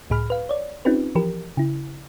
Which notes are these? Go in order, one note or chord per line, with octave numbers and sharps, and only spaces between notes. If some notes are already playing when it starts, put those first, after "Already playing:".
C#2 A2 G#4 B5 F6
B4 F5
C#5 D5
C4 C#4 D#4 F4 G4 B4
E3 F3 G4 A#4
C#3 E4